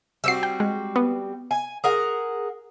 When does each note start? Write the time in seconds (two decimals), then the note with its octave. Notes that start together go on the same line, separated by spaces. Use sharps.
0.24 G3 C4 F#4 E6 C7
0.43 G5
0.60 G#3
0.96 B3
1.51 G#5
1.84 G#4 A#4 F#5